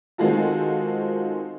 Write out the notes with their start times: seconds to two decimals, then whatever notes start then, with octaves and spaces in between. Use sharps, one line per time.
0.18 D#3 G#3 C4 F4 F#4 A4